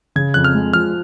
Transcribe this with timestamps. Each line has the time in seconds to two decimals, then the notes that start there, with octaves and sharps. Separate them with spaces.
0.16 C#3 G#6
0.34 F2 F#6
0.44 F6
0.54 G#3
0.73 F3 F6